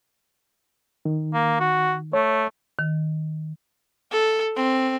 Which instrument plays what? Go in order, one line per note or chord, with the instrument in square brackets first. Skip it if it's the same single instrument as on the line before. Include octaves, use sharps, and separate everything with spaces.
[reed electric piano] D#3
[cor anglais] A#3
F#4
[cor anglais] A3 [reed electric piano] C#5
[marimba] D#3
[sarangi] A4
C4